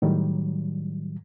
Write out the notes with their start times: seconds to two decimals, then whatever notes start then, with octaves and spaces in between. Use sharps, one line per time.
0.02 A2 D#3 F#3 G3